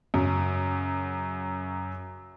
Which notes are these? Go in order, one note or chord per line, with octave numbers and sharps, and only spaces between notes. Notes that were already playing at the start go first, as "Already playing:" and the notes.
F#2 C#3